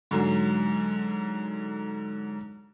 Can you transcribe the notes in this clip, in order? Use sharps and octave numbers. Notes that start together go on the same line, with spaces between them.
G#2 D3 F#3